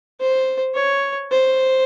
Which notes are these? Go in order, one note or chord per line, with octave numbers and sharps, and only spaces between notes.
C5
C#5
C5